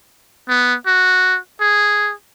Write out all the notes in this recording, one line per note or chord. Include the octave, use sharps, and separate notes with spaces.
B3
F#4
G#4